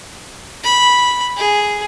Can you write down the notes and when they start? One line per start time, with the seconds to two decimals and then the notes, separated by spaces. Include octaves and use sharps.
0.63 B5
1.36 G#4